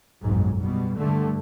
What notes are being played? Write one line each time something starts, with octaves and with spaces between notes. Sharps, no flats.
F#1 B1 F2 G#2
B2 G3
G2 D3 A3